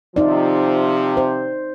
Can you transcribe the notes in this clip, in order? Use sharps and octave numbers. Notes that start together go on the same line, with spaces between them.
C3 F3 D#4 D5
C5